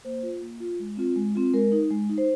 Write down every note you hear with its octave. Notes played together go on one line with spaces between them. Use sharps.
A#3 C5
F4
A#3
F4
G#3
C4 F4
G#3
C4 F4
G#3 A#4
D#4
G#3
D#4
C5